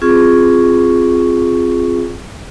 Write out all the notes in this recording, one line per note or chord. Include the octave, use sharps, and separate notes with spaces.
C4 F4 G#4 C#6